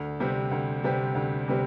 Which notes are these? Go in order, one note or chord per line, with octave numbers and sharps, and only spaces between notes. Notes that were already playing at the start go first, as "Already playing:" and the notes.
Already playing: D2
C3 G3 C4 G4
D2
C3 G3 C4 G4
D2
C3 G3 C4